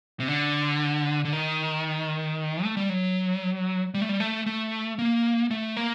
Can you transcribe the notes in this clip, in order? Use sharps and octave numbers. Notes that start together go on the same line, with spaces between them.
C3
D3
D3
D#3
A3
G3
F#3
G3
A3
G3
A3
A3
A#3
A3
A#3